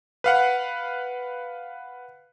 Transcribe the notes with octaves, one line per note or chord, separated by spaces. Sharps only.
B4 F5 F#5